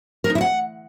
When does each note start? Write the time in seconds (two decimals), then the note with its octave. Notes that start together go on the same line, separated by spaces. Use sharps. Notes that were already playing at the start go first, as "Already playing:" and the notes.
0.24 A#4
0.30 D#4
0.35 E4
0.41 F#5